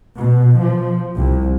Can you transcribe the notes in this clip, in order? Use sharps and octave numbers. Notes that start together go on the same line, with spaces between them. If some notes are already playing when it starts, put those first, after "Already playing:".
B2
F3
C2